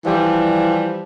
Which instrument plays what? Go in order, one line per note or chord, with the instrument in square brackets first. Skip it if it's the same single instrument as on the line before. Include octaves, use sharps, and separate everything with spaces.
[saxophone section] E3 F3 G3